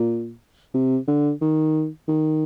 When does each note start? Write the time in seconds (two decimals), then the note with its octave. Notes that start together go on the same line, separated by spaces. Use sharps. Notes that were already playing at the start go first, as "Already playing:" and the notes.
Already playing: A#2
0.74 C3
1.07 D3
1.41 D#3
2.08 D#3